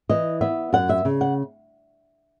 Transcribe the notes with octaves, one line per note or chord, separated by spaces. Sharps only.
E3 D#5
B3 E5
F#2 F#5
E5
C#3
F#5